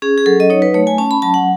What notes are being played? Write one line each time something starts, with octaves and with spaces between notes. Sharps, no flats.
C#4 G#4
G#4
F#3 A4
D#5
D#4 C#5
B4
A3 C#5
G#5
C#4 A5
B5
F#3 A5
F#5